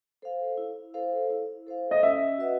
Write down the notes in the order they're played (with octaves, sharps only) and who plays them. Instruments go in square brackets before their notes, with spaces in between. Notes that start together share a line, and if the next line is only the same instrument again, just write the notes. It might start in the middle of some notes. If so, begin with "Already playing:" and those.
[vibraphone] A4 C5 F5
E4
A4 C5 F5
E4
A4 C5 F5
[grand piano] D#5
[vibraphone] C#4 [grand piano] E5
[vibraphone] F#4 B4 D#5 F#5